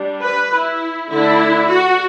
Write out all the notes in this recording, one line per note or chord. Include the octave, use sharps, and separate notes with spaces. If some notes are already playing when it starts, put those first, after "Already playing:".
Already playing: G3 D4
B4
E4
D3 A3 D4 E4
F#4